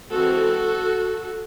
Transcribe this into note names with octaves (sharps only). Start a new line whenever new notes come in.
E3 G#3 C4 F#4 A4